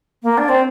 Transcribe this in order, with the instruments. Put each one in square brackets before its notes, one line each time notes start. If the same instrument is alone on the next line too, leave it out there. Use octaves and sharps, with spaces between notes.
[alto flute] A#3
D4
C4